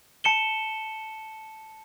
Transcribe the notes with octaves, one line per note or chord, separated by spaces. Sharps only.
A5 C#7 E7 G7